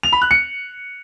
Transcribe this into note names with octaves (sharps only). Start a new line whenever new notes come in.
F7
B5
F#6
C#7